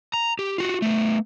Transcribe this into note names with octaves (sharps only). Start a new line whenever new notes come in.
A#5
G4
F4 F#4
A3 B3